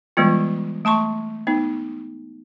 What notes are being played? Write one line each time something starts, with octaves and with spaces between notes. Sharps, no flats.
E3 G3 G#3 B3 F4
A3 A5 C6 C#6
B3 D#4